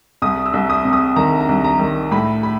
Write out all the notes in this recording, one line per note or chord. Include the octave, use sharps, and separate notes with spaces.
C2 D#6
E6
C2
D#6
C3
D#6
D#3 A#5
A#5
C2
A#5
D#3
A2 B5
B5